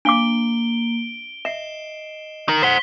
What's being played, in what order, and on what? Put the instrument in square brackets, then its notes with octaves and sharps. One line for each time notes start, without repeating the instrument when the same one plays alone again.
[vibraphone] A#3 [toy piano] D4 F5 D6 [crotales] D7 G7
[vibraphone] D#5 [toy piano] E5 [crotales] C7 E7
[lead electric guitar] D#4 A#4
[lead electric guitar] C5 F#5 [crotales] B6 G7